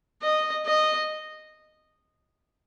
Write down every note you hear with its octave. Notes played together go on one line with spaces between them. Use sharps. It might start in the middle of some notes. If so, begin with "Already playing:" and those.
D#5
D#5